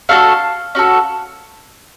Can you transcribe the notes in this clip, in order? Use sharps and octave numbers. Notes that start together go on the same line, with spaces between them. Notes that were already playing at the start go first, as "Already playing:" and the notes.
A3 D4 F#4 A4 F5
C#4 F#4 A4